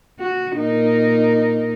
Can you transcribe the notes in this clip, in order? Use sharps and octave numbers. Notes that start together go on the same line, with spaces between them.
F#4
A#2 D#4 A#4